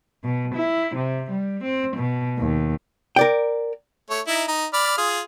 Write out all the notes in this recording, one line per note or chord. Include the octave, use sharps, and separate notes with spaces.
B2
E4
C3
G3
C4
B2
D#2
A#4 D5 G5
A3 C#5
D#4 E4
D#4
D5 B5 F6
F4 G#4